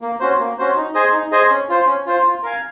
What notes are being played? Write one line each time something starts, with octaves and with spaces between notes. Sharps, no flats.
A#3
C#4 F#4 C5
A#3
C#4 F#4 C5
D#4
G#4 C5 D#5 G#5
D#4
G#4 C5 D#5 G#5
C#4
F4 C5
C#4
F4 C5
F4
A#4 F5 G#5